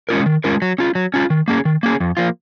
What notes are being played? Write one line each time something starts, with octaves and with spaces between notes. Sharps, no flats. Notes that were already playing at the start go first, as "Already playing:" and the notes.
G#3 C#4 F4 A#4
D#3
G#3 C#4 F4 A#4
F#3
C#4 F4
F#3
C#4 F4
D#3
A#3 C#4 G#4
D#3
A#3 C#4 G#4
F2
F3 A#3 F4